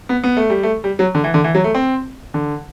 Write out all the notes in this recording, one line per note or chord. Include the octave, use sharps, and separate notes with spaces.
B3
B3
A3
G3
A3
G3
F#3
D3
E3
D3
E3
F#3
A3
C4
D3